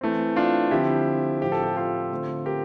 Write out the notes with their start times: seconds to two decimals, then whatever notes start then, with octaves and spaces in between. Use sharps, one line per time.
0.01 E3 A3 C4
0.36 D4 F4
0.71 D3 F3 C4 E4 G4
1.41 A2 F3 C4 G4
1.52 A4
1.63 E4 G4
1.77 F4 A4
2.11 D3 A3 C4
2.45 G4 A#4